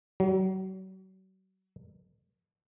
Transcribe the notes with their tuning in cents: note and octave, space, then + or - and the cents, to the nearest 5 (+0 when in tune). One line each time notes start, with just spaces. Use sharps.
F#3 +35